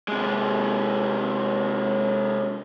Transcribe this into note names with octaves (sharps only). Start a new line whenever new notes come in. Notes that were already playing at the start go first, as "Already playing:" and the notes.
C3 G#3